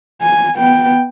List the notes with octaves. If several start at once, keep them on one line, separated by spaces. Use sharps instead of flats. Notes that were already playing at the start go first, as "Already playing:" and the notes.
G#5
B3 G5